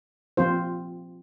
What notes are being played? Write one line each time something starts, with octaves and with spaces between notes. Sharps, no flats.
F3 C4 F4 C5